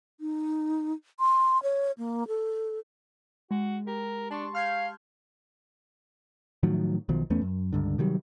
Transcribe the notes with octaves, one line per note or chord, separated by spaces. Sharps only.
D#4
C6
C#5
A#3
A4
G#3 F#4
G4 A#4
D4 A5 C6 C#6
F5 F6 G6 G#6
A2 D#3 F3 F#3
B1 B2 D#3 F3
E2 A3 B3 C#4
F#2
C#2 G2 D3
C3 D#3 F#3 G3